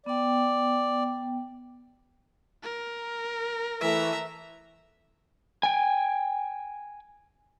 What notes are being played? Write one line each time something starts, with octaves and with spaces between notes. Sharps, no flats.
B3 D5 G5
A#4
E3 A3 E5 A#5
G5 G#5